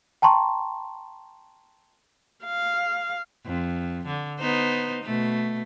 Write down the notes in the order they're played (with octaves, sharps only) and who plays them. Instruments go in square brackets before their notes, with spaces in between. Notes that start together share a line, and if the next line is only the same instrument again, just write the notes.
[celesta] G5 A5 A#5 C6 C#6
[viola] F5
[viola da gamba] F2
D3
B3 D#4 C5
B2 A3